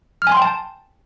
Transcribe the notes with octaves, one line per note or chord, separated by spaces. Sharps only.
F6
G#5
C6
G5
A5